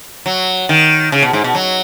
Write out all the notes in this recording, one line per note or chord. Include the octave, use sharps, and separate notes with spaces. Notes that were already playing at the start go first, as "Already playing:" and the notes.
F#3
D#3
C#3
B2
G#2
B2
F#3